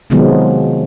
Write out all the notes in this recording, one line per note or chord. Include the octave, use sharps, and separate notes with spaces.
C3 D#3 F3 F#3 G#3 B3